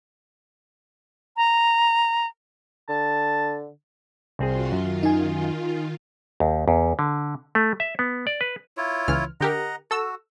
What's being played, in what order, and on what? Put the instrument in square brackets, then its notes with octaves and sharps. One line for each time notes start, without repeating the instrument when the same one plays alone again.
[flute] A#5
[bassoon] D3 [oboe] A5
[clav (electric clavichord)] C2 C4 G#4 [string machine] F4 F#4 C6
[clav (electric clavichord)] F#2 [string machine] D#3 F4
[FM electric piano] D#4 G#5
[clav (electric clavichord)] D#2
E2
D3
A3
E5
B3
D5
B4
[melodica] E4 F4 C#5
[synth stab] C#2 E3 F6
[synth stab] D3 G4 A#4 [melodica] D#5 F#5 A#5
[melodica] F#4 [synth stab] A4 E6